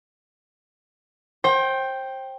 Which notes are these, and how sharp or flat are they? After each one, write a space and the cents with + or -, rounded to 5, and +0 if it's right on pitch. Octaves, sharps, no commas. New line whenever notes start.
C5 +30 G5 +0